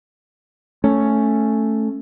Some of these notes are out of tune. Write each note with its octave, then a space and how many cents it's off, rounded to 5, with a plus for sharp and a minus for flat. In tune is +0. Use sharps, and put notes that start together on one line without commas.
A3 +0 C#4 +0